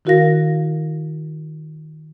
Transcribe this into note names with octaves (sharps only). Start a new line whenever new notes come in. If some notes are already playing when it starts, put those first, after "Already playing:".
D#3 E4 F#4 A#4 F5 A#6